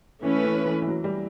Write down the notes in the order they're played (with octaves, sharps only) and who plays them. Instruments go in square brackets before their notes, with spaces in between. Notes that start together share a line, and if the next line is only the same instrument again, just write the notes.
[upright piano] E3 [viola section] A3 C#4 E4 B4
[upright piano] E3
E3
E3
F#3
G3